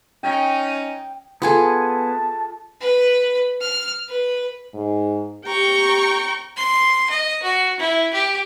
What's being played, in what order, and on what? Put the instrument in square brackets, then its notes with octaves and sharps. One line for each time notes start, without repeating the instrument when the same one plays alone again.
[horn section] C#4 D#4 [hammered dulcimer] G5
[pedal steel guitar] B3 G#5 [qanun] F4 G#4 A4 [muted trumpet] A5
[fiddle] B4
F6
B4
[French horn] G#2
[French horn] G4 [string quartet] G5 A#5 C#6
[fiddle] C6
D#5
F#4
E4
G4